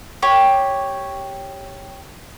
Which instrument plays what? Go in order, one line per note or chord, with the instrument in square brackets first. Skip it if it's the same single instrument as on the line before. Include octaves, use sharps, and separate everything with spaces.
[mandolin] G4 C#5